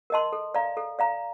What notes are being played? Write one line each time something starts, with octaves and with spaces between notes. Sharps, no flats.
A#4 D#5 A5 C6
A4
D5 F5 A#5
A4
D5 F5 A#5